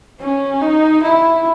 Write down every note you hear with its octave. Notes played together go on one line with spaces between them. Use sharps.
C#4
D#4
E4